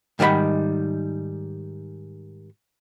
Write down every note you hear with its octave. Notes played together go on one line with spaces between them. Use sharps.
G#2 D#3 G3 A#4 F#5 B5